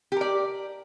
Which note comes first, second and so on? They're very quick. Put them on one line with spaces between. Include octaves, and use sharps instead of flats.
G4 A#4 D5